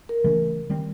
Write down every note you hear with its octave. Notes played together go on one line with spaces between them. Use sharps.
A#4
C#3 E3 A3 C#4
D#3 G3 C4